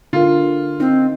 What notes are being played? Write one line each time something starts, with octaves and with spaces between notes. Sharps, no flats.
D3 F4 A#4
C4 D#4